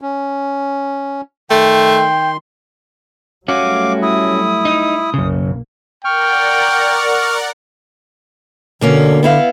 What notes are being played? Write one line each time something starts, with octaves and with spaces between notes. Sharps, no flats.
C#4
D#3 A3 G5 C6
F#3 G3 A3 C#4 F#4 F5 D6
E4 D#6
D#4
B1 F#2 C#3 A#3
A#4 D5 F#5 G5 C#6 F6
B2 D3 A#3 C#4
B3 E4 F5